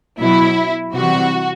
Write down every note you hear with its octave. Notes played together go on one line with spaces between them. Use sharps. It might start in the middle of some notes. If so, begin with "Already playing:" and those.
B2 F#3 E4
C3 E3 G3 F#4